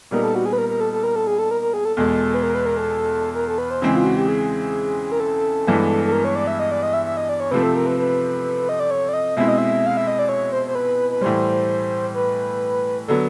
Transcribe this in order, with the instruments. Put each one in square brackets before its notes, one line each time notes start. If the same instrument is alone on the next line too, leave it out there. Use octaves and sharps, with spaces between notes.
[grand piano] A#2 G3 B3 D#4 [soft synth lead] A#4
[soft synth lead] A4
F#4
G#4
B4
A#4
A#4
A4
A4
A#4
A4
G#4
A4
A#4
A#4
G#4
A4
[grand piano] E2 B2 G#3 [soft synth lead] A4
[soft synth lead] B4
A#4
B4
A#4
A4
A#4
A4
B4
C5
[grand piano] C#3 E3 G#3 C4
[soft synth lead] F4
F#4
G4
G#4
A#4
A4
[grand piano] G2 E3 G#3 B3
[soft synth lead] A4
A#4
C#5
D5
E5
D#5
D5
D#5
E5
E5
D#5
D5
C#5
[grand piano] C3 F3 A3 C4 [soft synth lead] B4
[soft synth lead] A4
A#4
B4
B4
D#5
D5
C#5
D5
D#5
[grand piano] B2 G#3 C4 E4 [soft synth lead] E5
[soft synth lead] D#5
E5
F5
E5
D#5
D5
C#5
C5
C5
B4
B4
[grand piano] A2 E3 G3 [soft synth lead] C5
[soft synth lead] B4
[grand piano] D3 F#3 B3 [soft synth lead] A4